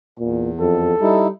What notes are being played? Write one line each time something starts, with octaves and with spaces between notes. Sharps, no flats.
E2 A#2
F2 A4
G3 D#4 E4